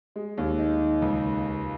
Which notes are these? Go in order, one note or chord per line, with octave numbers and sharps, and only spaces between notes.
G#3
D#2
D#4
D#3
C#2